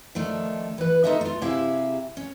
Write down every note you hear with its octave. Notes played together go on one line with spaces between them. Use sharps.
D#3 F3 A3 D4
E3 B4
A3 D#4 F4 A4 D#5 E5
A3 F4
C3 E4 G4 G#4 E5 F5
C#4